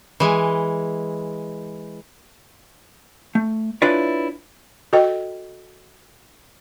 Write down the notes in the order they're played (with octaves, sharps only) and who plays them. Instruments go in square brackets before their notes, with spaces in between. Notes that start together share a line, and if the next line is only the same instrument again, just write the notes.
[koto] E3 G#3
[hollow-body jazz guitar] A3
D4 E4 F4 B4 C#5 D5
[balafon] F#4 A4 D#5 G5